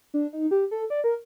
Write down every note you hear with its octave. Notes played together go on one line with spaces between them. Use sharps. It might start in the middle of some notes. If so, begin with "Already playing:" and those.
D4
D#4
G4
A4
D5
A#4